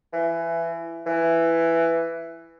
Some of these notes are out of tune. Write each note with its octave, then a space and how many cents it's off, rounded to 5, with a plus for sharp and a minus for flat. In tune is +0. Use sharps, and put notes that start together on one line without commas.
E3 +20
E3 +10